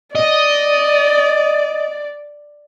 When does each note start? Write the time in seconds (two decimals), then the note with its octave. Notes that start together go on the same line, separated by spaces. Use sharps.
0.15 D5 D#5